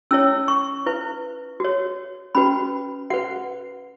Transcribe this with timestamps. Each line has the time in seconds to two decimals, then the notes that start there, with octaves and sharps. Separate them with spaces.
0.11 C#4 E4 C#5 E6
0.48 C#6
0.86 E4 B4
1.60 F#4 C#5
2.35 C#4 F#4 B4 B5
3.10 F#4 B4 F#5